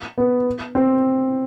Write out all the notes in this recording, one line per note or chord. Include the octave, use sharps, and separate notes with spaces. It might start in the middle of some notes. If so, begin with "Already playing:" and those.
B3
C4